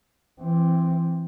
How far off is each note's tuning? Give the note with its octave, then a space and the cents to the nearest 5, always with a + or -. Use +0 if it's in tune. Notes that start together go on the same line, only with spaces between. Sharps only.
E3 +25 C4 +0